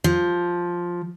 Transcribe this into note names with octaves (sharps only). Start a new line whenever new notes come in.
F3